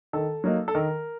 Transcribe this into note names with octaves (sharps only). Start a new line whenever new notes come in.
D#3 A4
F#3 A#3 D#4
A4
D#3 A#4